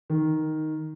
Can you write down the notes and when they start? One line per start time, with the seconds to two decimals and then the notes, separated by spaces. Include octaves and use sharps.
0.10 D#3